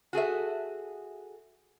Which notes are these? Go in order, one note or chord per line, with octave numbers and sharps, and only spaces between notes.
F#4 G#4 A4 E5